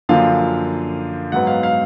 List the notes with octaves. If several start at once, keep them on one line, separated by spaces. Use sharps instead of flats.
F#2 D3 F3 A#3 F5
G#2 F#3 B3 F#5
F5
F5